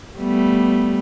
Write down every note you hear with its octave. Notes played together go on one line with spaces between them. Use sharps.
G3 A3 B3